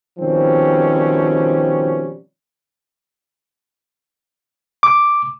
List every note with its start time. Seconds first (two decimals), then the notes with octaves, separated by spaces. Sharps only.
0.19 B2 D#3 F3 G3 C4 C#4
4.83 D6